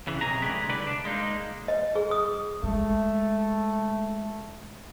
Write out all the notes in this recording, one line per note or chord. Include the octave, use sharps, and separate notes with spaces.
C#3 E3
B1 F2 C3 G#4 A#5
D3 G#3 A3 G4 G#4 B4
C2 D3 B4 D5
D4
G#3 A#3 D#4
D#5
G#4
D#6
G#3 A3